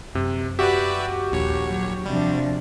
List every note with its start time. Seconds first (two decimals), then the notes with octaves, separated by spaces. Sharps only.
0.15 F#2 C3
0.59 F#4 G4 B4 D5 E5
1.32 A#1 D#2 C#5
1.66 F#3
2.06 C3 F3 G3 D4